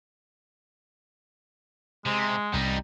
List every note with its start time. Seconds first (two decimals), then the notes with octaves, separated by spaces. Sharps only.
2.06 C3 G#3
2.54 C2 G3 D#4